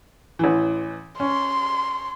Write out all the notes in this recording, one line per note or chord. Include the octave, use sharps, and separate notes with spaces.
A1 E3
C#4 C6